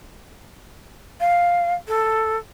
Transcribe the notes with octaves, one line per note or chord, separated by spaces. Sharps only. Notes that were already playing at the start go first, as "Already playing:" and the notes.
F5
A4